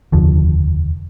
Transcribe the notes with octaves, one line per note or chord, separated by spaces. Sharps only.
F1 D#2 D3 F3